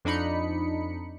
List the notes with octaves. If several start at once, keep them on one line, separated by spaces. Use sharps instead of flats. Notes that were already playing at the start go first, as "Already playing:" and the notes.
F2 D4 D#4 B5 C#7